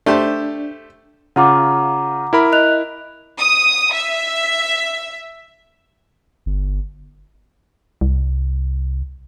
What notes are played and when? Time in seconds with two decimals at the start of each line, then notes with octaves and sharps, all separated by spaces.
0.06 A3 D4 G4 C5
1.36 C#3 F4 F#5 A#5 D6
2.33 E4 A#4 B5
2.52 D#5 F#6 F7
3.39 D#6
3.94 E5
6.46 G1
8.01 C2